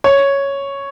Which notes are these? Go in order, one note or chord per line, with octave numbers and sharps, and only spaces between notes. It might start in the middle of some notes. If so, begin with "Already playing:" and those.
C#5